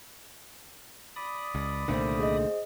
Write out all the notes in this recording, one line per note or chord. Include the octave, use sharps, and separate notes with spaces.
D5 B5 D#6
C#2
C2 A#2 D3 D#3 A3 C4
G#4 C5 D#5